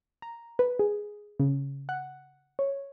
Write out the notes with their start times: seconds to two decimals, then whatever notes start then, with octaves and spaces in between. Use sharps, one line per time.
0.22 A#5
0.59 B4
0.79 G#4
1.40 C#3
1.89 F#5
2.59 C#5